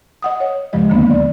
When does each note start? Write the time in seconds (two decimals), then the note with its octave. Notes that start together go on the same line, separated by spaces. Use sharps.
0.22 D#5 F#5 D#6
0.40 C#5
0.73 D2 G2 C#3 F3 G#3 D#5
0.89 D#2 D3 D#3 A#3 B3 D4
1.10 D5